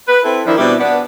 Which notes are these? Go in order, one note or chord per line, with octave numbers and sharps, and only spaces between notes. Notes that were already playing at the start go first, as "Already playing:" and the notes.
B4
C4 E4 A4
D#3 F3 D4 E4
B2 G3 C4 D4 E4
B3 D4